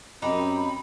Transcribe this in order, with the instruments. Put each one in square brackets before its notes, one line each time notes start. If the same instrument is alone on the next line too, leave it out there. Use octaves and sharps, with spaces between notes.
[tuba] F#2 [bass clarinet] C4 [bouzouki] D#4 G4 [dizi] B5